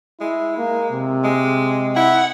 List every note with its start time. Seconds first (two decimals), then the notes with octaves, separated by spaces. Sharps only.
0.21 G#3 E4
0.58 A#3
0.92 C3
1.24 G#3
1.96 E4 F#5